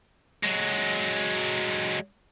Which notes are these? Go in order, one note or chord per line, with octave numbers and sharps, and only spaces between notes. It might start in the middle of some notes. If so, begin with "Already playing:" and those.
F#3 G#3